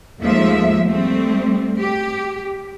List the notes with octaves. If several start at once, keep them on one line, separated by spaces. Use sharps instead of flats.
D#2 F3 G#3 A3 E5
G3 A3 C4
G4